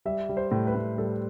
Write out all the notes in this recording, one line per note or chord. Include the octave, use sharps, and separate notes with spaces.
G3 E5
G3
C5
A2
B4
A2
G3 A4